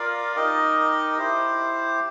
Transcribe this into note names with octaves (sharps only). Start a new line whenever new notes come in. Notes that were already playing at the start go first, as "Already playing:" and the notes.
Already playing: F4 A#4 D5 F5
D#4 G4 A#4 D#5
E4 G4 C5